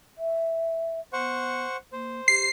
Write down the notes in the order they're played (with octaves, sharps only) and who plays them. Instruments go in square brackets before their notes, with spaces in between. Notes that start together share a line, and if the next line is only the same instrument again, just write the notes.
[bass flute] E5
[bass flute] B3 [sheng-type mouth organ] C5 F#5 C#6
[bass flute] A#3 [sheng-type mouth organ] C5
[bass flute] G4 [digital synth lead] C7